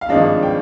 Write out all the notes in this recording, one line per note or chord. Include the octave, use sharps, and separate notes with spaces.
F5
G#1 G2 F3 G#3 D4 D#5
G5